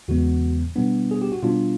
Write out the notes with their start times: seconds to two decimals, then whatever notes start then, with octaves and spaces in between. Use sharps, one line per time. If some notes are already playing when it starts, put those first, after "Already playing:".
0.08 E2 C#3 E3 G#3 B3 F#4
0.76 B2 G3 B3 D4
1.11 G#4
1.22 G4
1.32 F#4
1.43 B2 G3 B3 D4 F4